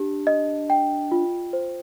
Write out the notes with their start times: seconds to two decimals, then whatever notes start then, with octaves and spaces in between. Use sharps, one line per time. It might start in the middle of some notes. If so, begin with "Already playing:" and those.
Already playing: D4 G4
0.27 D#5
0.70 G5
1.12 F4
1.53 C5